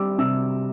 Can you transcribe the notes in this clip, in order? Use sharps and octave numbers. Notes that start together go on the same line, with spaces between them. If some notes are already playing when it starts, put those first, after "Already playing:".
Already playing: G3 C4 D6 E6
C3 E6